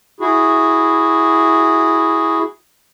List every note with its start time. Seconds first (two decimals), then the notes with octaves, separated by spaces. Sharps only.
0.20 E4 F#4 G#4